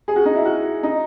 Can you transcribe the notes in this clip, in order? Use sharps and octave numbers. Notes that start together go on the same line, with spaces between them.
G#4
F#4
D#4
E4
F#4
D#4